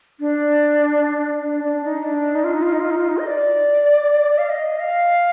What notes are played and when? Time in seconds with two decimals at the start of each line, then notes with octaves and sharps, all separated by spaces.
0.20 D4
1.44 D4
1.64 D4
1.85 D#4
2.04 D4
2.35 D#4
2.44 F4
2.53 D#4
2.63 F4
2.72 D#4
2.80 F4
2.91 D#4
2.99 F4
3.09 D#4
3.18 D#5
3.27 D5
4.38 F5
4.50 D#5
4.80 F5